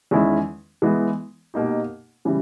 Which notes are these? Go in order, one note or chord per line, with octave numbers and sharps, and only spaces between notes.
E2 D#3 G#3 C#4 E4
E3 G#3 B3
B2 A#3 D#4 G4
C#3 E3 G3